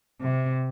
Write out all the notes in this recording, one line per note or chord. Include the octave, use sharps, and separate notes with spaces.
C3